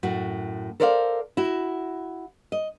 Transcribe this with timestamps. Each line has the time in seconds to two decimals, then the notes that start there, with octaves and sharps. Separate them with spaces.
0.03 F#2 A2 F#4
0.80 A4 A#4 C5 D5 D#5 F5
1.37 E4 F#4
2.52 D#5